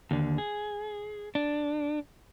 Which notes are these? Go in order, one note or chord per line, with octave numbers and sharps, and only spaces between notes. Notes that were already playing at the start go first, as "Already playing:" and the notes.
D#2 D3
G#4
D4